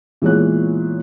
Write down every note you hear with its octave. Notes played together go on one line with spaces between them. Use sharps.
A#2 E3 G#3 B3 C#5 F#6